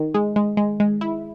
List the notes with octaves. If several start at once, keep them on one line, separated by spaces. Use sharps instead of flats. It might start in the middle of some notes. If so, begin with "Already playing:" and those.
Already playing: D#3
G#3
G#3
G#3
G#3
E4